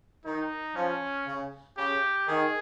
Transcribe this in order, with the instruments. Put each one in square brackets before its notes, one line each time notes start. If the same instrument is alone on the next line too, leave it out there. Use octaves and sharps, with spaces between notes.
[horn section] D#3 [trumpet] D#4
[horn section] F3 [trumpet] C#4
[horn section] C#3
[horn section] C#3 [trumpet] G4
[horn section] D#3 [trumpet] G#4